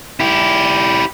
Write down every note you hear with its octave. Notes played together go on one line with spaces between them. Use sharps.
E4 G4